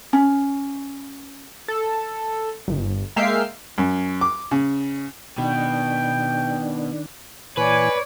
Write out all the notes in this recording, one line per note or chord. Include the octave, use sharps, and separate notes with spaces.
C#4
A4
G1
G#3 A#3 E5 F5 G5 C7
F#2
D6
C#3
B2 D#3 D4 G5
A#2 E3 B4 C#5 D5 G#5